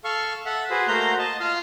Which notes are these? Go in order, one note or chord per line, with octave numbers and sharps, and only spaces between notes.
A4 F5 C#6
A4 E5 F#5
F#4 G#4 B4 C5
A3 A#3 F#4 C5 A#5 G6
D#5 A5
F4 F5